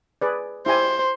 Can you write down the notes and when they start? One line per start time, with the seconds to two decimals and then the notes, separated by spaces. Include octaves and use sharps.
0.21 G#4 B4 D5
0.66 E4 G4 C5 G#5